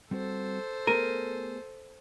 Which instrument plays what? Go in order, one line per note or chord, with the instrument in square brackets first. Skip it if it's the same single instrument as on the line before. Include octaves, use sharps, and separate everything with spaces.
[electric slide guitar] G3 C4 F#4 [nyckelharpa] A4 C5
[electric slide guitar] A3 B3 G#4 [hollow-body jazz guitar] A#4 [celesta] D#7